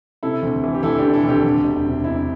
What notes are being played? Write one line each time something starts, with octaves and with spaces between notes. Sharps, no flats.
C3 E4 A4
D2
E3
G4
D2 E4 A4
D4 G4
C3
E4 A4
D2
D4 G4
D2
E1
C3
E1 E4